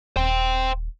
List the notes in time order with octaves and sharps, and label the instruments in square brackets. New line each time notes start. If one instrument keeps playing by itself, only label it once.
[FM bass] D#1 [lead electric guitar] C5 G5